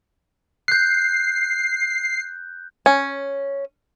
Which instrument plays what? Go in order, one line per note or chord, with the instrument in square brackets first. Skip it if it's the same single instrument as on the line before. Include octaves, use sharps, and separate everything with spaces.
[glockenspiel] F#6 G6 [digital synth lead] C7
[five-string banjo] C#4